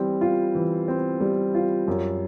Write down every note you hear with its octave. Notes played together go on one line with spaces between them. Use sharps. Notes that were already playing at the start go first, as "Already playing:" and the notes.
Already playing: E3 G3 C4
F4
E3
C4
G3
F4
F#2